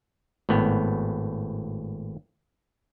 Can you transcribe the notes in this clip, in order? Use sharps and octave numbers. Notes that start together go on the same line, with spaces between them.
G#1 A2 B3